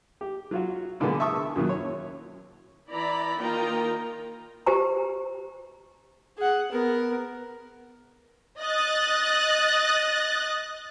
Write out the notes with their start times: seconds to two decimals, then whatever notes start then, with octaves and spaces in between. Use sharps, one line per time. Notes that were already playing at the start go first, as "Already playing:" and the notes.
0.21 G4
0.51 F#3 F4 F#4
1.00 A#2 D3 E3 G#3 A#3 B3
1.20 E5 A5 C#6 D#6 E6
1.56 F#2 A#2 D#3 F#3
1.69 C#5
2.91 E3 E4 D5 A#5 B5
3.39 D#3 A#3 D#4 F4 G5 A#5
4.66 G4 C5 G#5 A#5
6.38 G#4 F#5
6.72 B3 A#4
8.59 D#5 F#6 A6